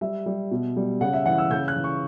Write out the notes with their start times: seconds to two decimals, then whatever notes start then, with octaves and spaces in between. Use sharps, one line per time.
0.01 G3 E5
0.26 G3
0.51 B2
0.76 G3
1.01 C#3 F#5
1.13 E5
1.26 E3 F#5
1.38 E6
1.51 C#3 G6
1.68 F#6
1.76 E3
1.84 C#6